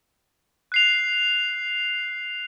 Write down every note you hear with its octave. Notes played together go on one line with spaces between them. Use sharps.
F#6 C7 F7